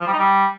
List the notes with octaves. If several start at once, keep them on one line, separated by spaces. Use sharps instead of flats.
F3
G3
D#4
G3